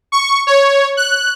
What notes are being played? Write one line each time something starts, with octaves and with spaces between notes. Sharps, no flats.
C#6
C#5
F#6